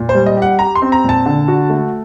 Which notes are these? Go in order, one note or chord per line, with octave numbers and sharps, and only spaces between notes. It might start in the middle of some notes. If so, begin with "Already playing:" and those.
Already playing: A#2
C5
G3
D#5
G4 F#5
G4 A#5
C6
C4
A#5
A#2 A5
D3
F#4
A3